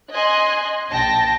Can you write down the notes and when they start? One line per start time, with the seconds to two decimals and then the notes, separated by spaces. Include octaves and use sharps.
0.13 D#5 G#5 C6 F#6
0.92 A#1 G5 A5 A#6